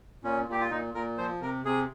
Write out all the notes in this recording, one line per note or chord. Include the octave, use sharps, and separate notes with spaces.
A#2 C#4
A#2 G4
F4
A#2 D#4
A#2 A#4
F3 C5
C3 A#4
C3 G#4